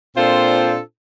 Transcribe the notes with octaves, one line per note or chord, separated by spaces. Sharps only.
A#2 C4 D4 F4 A4 C5